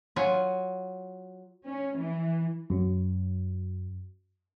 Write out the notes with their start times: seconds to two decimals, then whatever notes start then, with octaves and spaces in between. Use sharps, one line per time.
0.16 F#3 F4 G#5
1.66 C#4
1.96 E3
2.70 F#2 F#3